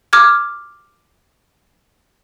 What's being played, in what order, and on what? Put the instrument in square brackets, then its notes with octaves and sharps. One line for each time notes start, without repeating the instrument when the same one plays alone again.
[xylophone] D6 F6 G#6